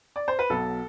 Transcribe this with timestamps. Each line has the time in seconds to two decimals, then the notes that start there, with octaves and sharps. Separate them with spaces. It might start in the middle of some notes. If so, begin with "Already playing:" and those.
0.16 D5
0.28 C5
0.39 B4
0.50 B1 B2 F#3 A4